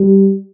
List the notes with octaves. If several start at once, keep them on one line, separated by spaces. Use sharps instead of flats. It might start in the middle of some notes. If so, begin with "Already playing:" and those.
Already playing: G3